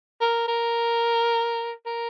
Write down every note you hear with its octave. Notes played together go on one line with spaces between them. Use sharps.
A#4
A#4
A#4